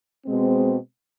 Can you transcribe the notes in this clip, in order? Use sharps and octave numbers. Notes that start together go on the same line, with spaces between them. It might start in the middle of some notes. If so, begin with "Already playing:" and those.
B2 G#3 C4